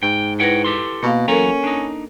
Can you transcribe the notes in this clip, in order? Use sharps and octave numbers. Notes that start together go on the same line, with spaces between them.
G#2 G5
E4 B4 C#5 F#5 G5 A#6
G4 A4 C6
B2 A#3 F5
E2 F#3 C#4 A4 A#4 A#5
D4 D#4